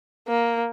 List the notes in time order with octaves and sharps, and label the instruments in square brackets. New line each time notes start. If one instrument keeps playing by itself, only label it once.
[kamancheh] A#3